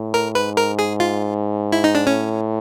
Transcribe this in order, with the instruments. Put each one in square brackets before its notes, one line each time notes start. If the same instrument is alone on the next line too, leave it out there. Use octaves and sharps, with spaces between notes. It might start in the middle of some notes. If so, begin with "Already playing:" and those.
Already playing: [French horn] A2
[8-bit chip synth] A#4
[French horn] G#2 [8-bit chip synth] B4
[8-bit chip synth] A#4
G#4
F4
E4
D#4
D4
[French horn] A2 [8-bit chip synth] C#4